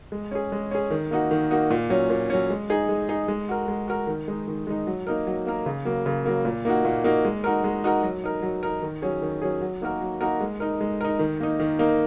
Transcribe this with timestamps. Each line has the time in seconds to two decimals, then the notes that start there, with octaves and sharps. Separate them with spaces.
0.12 G#3
0.31 C#4 G#4
0.52 G#3
0.71 C#4 G#4
0.91 D#3
1.11 A#3 D#4 F#4
1.31 D#3
1.51 A#3 D#4 F#4
1.70 A#2
1.90 F#3 C#4
2.10 A#2
2.30 F#3 C#4
2.50 G#3
2.70 D#4 G#4
2.89 G#3
3.09 D#4 G#4
3.28 G#3
3.49 F#4 A#4
3.68 G#3
3.88 F#4 A#4
4.07 D#3
4.28 G#3 D#4
4.48 D#3
4.67 G#3 D#4
4.87 F#3
5.07 A#3 D#4 A#4
5.27 F#3
5.46 A#3 D#4 A#4
5.66 C#3
5.85 F#3 A#3
6.06 C#3
6.25 F#3 A#3
6.45 A#2
6.65 A#3 D#4 F#4
6.85 A#2
7.04 A#3 D#4 F#4
7.25 G#3
7.44 D#4 F#4 A#4
7.64 G#3
7.84 D#4 F#4 A#4
8.03 F#3
8.24 D#4 A#4
8.42 F#3
8.63 D#4 A#4
8.82 D#3
9.02 F#3 C#4 G#4
9.22 D#3
9.42 F#3 C#4 G#4
9.62 F#3
9.82 A#3 D#4 F#4 A#4
10.01 F#3
10.21 A#3 D#4 F#4 A#4
10.40 G#3
10.60 D#4 A#4
10.81 G#3
11.01 D#4 A#4
11.19 D#3
11.40 A#3 D#4
11.60 D#3
11.79 A#3 D#4